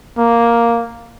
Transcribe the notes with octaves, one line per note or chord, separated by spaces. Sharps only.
A#3